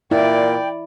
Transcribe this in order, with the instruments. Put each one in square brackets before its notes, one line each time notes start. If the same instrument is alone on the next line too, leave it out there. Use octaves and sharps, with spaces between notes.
[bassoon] A#2 [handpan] E4 [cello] D5 [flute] G5